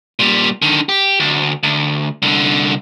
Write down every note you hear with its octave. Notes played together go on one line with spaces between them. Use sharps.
A#2 G3
D3 D#3
G4
D2
D2
C2 D3